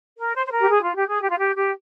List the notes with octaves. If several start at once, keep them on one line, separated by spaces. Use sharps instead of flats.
A#4
C5
C5
A#4
G4
G#4
F4
G4
G#4
G4
F4
G4
G4